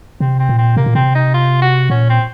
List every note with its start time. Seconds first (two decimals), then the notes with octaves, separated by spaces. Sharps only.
0.20 C3 C4
0.39 C4
0.49 A#2
0.58 C4
0.77 C3 A#3
0.86 A#2
0.95 C3 C4
1.15 D#4
1.34 F4
1.62 F#4
1.90 A#2 C#4
2.09 C4